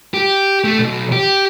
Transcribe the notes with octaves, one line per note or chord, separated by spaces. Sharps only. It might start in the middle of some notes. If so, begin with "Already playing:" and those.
G4
A3
B1
G4